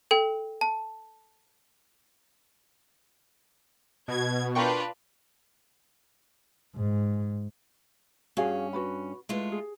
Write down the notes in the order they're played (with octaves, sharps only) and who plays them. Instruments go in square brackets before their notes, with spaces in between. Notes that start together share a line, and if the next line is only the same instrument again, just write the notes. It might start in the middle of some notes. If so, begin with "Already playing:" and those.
[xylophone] A4 G5
A5
[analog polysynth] B2 [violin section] G#6
[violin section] D4 F4 B4 [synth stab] A#4 G5 C#6
[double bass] G#2
[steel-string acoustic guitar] G2 C#4 [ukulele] F#4 G#4 F5
[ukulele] F#4 B4 B5
[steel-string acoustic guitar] G#3 A3 F4 [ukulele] E4 B4
[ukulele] G#4